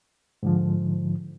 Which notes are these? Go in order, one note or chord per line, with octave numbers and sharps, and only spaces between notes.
G#2 D3 F3